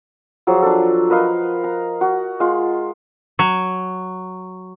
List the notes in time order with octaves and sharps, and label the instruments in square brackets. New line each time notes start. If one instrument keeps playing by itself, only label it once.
[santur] F3 F#3 G#4
D4 A4
A#4 B4 D#5 F5
A#5
F#4
G#3 F4
[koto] F#3